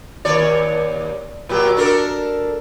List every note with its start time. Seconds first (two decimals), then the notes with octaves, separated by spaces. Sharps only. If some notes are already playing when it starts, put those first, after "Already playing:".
0.25 D#2 C#5 D5
1.49 A#2 F#3 G4
1.77 D4 A4 A#4